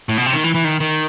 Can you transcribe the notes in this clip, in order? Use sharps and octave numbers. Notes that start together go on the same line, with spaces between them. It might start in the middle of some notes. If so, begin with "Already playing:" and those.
A2
B2
C3
D#3
E3
E3
D#3
D#3